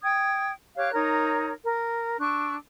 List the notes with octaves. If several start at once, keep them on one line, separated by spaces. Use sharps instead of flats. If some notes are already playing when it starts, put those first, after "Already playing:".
G5 D#6 G#6
G4 C#5 F5 F#6
D#4 A#4 C#5
A#4
D4 C#6 E6 F#6